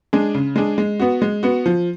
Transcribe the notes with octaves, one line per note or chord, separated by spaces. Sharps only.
G#3 D4 G#4
C#3
G#3 D4 G#4
G#3
B3 F#4
G#3
B3 F#4
F3